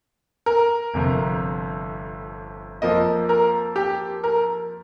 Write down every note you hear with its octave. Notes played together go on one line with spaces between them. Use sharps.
A#4
G1 F2 C3
F2 F3 A#3 D#5
A#4
G4
A#4